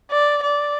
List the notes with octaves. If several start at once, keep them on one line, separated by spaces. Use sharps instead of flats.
D5
D5